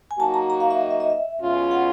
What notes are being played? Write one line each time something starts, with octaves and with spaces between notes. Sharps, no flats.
G#5
F#3 A#3 D#4 F#4 A5
A#5
A#5
F5
E5
D#5
E5
D#5
E5
B2 G#3 C#4 F4
F#5